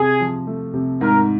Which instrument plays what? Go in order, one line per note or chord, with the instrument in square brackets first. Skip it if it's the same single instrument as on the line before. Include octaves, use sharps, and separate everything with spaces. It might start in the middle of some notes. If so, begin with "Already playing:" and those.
Already playing: [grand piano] C3 [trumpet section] G#4
[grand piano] F3
A3
C3
[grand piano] G#2 [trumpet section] A#4